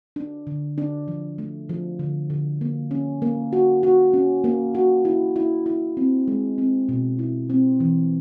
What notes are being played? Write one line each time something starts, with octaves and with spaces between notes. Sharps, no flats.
D4
D3
D4
F3
A3
F3
D3
D3
A#3
C#4
A#3
F#4
F#4
C#4
A#3
F#4
E4
E4
E4
C4
G#3
C4
B2
E4
C4
E3